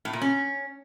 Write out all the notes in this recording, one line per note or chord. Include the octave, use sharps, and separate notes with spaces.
A2
A#2
C#4